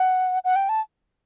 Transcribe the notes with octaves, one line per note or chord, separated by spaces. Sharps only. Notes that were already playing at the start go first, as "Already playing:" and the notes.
Already playing: F#5
F#5
G5
A5